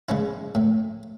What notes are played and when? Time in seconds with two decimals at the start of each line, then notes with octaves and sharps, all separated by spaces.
0.09 C#3 G#3 C#4 E4
0.55 A2